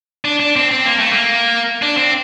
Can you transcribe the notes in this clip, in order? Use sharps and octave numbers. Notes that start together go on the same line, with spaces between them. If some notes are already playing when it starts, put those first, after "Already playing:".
D4
D4
C4
C4
A#3
A3
A#3
D4
C4